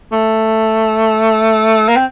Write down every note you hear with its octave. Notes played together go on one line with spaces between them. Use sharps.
A3
A#3
C4